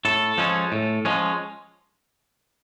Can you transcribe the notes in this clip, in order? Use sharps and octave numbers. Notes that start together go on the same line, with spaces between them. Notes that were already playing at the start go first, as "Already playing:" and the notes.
A2 A4
F3 G#3 C#4
A2
F3 G#3 C#4